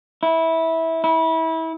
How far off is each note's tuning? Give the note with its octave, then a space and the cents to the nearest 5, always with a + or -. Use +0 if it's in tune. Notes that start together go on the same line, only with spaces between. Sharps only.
E4 -15
E4 -25